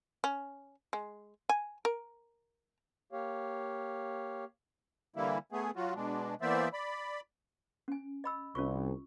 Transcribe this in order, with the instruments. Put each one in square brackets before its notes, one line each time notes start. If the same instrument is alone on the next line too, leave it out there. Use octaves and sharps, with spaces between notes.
[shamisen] C#4
G#3
G#5
A#4
[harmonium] A#3 G4 C#5 F5
[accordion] D3 E3 G3 A#3 E4
A3 B3 G#4
F#3 F4 F#4
B2 G#3 D4
E3 A#3 B3 C5 D5 E5
D5 B5
[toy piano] C#4 G#5
D#5 B5 E6
[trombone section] C2 [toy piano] C#4 F4 C#6